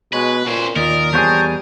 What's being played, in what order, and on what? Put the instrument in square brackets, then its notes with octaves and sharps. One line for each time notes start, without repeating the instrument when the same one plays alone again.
[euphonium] B2 [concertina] G#3 C#5 [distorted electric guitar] B4
[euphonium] A#2 [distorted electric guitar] C#3 C5 [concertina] C#5
[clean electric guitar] D#2 [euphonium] A#2 [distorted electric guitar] A#4 [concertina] D5 D#5
[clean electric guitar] E2 F#4 G#4 [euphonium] G3 [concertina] C5 C#5 A5